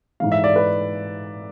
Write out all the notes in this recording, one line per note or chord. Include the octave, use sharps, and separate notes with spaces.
G#2 E3 G#3 F5
E5
D5
B4